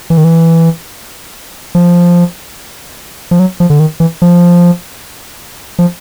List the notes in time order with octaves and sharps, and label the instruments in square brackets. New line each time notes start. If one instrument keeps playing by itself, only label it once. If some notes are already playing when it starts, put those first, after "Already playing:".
[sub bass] E3
D#3
E3
F3
F3
F#3
F3
D3
D#3
E3
F3
F3